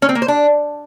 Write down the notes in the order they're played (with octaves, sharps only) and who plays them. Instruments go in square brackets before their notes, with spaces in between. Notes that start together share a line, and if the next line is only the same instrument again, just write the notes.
[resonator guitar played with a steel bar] C#4
C4
A#3
C5
D4